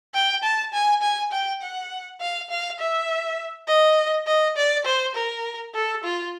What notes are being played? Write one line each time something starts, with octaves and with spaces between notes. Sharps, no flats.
G5
A5
G#5
G#5
G5
F#5
F5
F5
E5
D#5
D#5
D5
C5
A#4
A4
F4